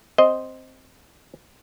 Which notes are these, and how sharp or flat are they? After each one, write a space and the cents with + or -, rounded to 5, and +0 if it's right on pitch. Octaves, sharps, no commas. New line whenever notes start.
C4 +0 C5 +0 D#5 +0